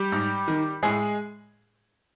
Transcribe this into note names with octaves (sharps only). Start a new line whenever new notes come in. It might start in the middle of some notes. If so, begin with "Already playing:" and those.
Already playing: G3 G4
G#2
D#3
A2 G#3 G#4